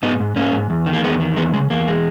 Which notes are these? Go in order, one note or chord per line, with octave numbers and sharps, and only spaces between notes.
G#2 B3 D#4
G#2
G#2 A#3 C#4
G#2
E2
D#3
A#3
E2 G#3 B3
D#3
E2 G#3 B3
C#3 G#3
E2 A#3
G#3